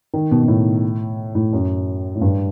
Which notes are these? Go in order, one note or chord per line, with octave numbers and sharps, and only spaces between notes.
D#3
B2
B2
A2
A2
F#2
A2
G2